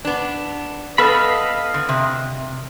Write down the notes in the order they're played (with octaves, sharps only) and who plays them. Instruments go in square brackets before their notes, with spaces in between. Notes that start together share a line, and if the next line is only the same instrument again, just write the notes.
[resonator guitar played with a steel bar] B3 D4
[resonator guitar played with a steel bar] B3 A4 B4 [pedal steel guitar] D#5 F5 B5
[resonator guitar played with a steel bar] D3
C3